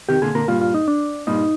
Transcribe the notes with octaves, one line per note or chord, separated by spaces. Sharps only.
C3 D#3 G4
A#2 D3 G#4
A#2 D3 A#4
G2 A#2 F4
F4
D#4
D4
G2 A#2 D#4